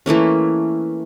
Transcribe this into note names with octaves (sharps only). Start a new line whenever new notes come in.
E3 A3 A#3 C#4